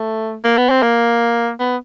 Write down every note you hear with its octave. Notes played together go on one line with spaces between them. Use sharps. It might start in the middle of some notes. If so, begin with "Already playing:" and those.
Already playing: A3
A#3
B3
C4
A#3
B3